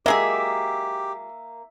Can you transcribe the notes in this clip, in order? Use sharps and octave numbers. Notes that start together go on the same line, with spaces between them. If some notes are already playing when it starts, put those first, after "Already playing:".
F#3 G#3 A#3 G4 G#4 E5